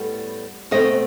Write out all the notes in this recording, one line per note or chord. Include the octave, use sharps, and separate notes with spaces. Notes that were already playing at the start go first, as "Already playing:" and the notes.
Already playing: A2 G3 B3
B2 A3 C4 D#5